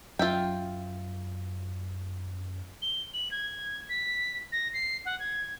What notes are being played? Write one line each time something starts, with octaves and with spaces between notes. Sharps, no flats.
F#2 F4 E5 G5
G7
F#7
G#6
B6
A#6
C7
F#5
G#6